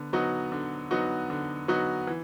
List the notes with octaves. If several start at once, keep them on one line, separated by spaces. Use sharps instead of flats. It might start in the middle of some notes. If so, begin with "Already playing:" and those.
Already playing: D3 B3
F#3 B3 D#4 F#4
D3
F#3 B3 D#4 F#4
D3
F#3 B3 D#4 F#4
E3